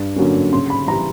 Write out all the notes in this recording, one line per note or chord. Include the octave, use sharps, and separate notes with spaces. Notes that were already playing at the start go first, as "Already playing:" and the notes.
Already playing: G2
D3 F#3 A#3 C#4
C#3 C6
B5
E3 G3 A#5